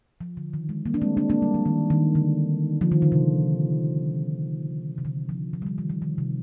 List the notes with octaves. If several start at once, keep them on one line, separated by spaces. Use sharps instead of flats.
F3
D3
D#3
G#3
G3 A#3
D4
G#3 C4
A#3 D4
A#3 D4
G3
F3
D#3
D#3
D3
F3
D#3
D3
C3
C3
D3
F3
F3
G3
F3
D#3
F3
D#3
C3